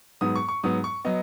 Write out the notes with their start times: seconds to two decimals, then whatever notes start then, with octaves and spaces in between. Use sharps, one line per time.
0.21 G#2 F#3 B3 D#6
0.35 C#6
0.48 C#6
0.64 G#2 F#3 B3 D#6
0.84 C#6
1.05 F#3 B3 D#5